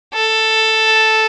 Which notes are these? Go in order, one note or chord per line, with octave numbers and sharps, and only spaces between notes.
A4